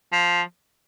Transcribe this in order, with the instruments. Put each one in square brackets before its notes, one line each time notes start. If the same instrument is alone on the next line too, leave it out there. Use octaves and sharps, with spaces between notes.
[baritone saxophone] F3